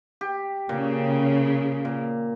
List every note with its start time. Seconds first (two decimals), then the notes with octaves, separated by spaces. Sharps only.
0.21 G4
0.69 A#2 C#3
1.85 A#2